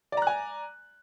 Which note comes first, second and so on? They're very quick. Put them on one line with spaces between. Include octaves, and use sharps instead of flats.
D5 A#5 F#6 G#5